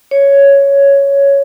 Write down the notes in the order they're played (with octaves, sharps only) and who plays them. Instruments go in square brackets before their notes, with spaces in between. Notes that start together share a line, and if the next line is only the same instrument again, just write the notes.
[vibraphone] C#5